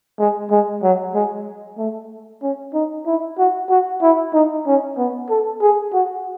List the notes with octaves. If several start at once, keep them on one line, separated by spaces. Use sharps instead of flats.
G#3
G#3
F#3
G#3
A3
C#4
D#4
E4
F#4
F#4
E4
D#4
C#4
B3
A4
G#4
F#4